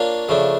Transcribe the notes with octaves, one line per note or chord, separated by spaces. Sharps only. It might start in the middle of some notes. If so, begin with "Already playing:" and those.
Already playing: A#3 D4 F4 C#5
C#3 F3 A3 D4